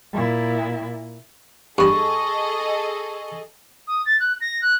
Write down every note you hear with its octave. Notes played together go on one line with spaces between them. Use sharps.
A#2 E4
G2 B3 G#4 A4 D#5 C#6
D#6
A6
F#6
A#6
F#6